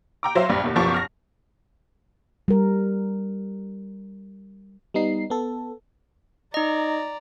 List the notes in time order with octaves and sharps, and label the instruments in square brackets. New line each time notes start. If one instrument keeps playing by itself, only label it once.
[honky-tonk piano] G5 A#5 D6
F#3 C5 E5 F5
A#1 G2
D#2 B2
F#1 B2 F3 G4 C#6
F6 A#6
[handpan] G3 A#4
[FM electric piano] G3 B3 D#4 C7
B3 A4
[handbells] D#4 D#5 [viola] D5 A#5